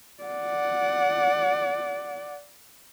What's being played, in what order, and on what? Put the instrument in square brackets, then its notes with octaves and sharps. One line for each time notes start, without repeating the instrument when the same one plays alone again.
[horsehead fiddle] D5 F#5